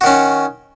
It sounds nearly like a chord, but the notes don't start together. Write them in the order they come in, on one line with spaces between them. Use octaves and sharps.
F#4 D#3 C#4